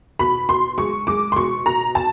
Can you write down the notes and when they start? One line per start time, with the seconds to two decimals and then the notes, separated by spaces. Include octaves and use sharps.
0.19 B2 B5
0.49 B2 C6
0.78 G#3 C#6
1.07 G#3 D6
1.32 C6
1.36 B2 C#6
1.66 B2 A#5
1.95 A5